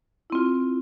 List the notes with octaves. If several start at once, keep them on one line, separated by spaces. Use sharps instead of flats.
C4 E4 F4